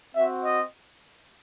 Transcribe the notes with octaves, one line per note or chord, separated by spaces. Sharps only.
C4 F#4 E5
D#5